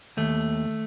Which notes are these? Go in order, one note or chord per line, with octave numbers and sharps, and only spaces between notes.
D#2 A3